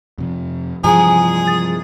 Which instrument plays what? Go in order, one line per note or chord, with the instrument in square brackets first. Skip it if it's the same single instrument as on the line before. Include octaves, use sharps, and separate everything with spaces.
[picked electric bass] F2 C3 F3
[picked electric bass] G2 C3 E3 [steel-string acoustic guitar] F3 G#3 [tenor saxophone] G#4 [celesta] G#5 A#5
[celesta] A6